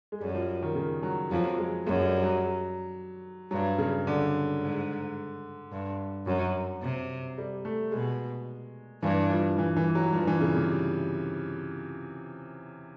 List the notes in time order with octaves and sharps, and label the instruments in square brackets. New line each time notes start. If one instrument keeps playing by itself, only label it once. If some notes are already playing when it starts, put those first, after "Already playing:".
[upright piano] G#3
[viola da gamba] F#2 [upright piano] G3
[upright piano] F3
D#3
C#3
F#3
[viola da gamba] F2 [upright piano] F#3
[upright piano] G#3
[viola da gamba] F#2 [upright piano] G#3
[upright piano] G3
F#3
[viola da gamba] G2 [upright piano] F#3
[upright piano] C#3
D3
[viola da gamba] G#2
G2
[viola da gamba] F#2 [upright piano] F#3
[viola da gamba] C3
[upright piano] G3
A3
[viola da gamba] B2 [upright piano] G#3
[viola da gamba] G2 [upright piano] E3
[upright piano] F3
E3
E3
F#3
[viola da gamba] G2 [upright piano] F3
[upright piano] E3
C#3
C3